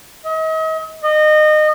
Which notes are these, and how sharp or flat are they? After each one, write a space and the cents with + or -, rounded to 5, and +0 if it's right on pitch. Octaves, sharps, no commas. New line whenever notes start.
D#5 +40
D#5 -25